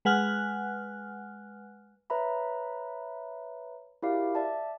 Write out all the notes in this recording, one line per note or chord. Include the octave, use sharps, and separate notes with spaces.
G#3 B4 F#5 G#5 F6 F#6
B4 C#5 E5 A#5 B5
E4 F#4 G4 A#4 D5 F5
D5 E5 A5